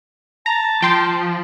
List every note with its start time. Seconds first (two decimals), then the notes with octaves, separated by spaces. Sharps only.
0.46 A5 A#5
0.82 F3 G5 C6